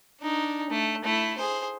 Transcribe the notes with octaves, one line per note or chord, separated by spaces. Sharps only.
D4 D#4
A3
A3 E4
G#4 C5